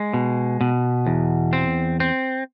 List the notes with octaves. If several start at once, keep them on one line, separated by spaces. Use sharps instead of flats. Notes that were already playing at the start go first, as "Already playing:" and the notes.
Already playing: G#3
B2
B2
E2
C4
C4